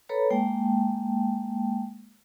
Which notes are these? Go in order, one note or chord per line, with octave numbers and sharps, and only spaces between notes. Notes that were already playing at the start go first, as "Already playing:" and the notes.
A4 B4 C#5 A#5 B5
G#3 A#3 G5 A5